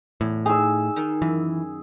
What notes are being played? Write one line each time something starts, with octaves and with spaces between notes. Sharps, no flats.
E2 A2
D#4 G#4 E6
D#3 D#4
F#2 E3